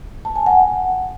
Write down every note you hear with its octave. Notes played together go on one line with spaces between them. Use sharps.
A5
G#5
F#5